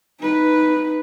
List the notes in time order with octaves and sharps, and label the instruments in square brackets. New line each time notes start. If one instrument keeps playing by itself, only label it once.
[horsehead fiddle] D#4 B4